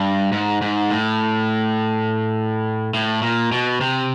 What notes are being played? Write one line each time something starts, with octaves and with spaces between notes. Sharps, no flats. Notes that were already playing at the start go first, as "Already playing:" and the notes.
Already playing: G2
G#2
G#2
A2
A2
A#2
B2
C3